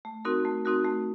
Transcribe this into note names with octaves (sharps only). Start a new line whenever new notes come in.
A3
C4 D#4 F#4 A#4
A3
C4 D#4 F#4 A#4
A3